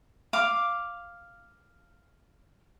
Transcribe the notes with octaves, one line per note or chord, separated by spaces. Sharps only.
F5 D6